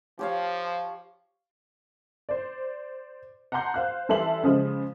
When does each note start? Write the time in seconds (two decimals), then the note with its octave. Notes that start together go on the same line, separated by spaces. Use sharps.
0.19 F3 G4 C#5 F5
2.29 C5 D5
3.52 F#5 A5 A#5 C6 G6
3.74 C5 F5 F#6
4.09 E3 G3 A4 E5 C6 F#7
4.43 C#3 F3 G#3